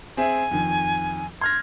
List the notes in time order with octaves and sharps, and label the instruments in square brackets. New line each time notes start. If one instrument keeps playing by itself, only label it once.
[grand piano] C4 G#4 E5 [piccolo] G#5
[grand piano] F2 D#3
[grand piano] C6 F6 A#6 [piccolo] G#6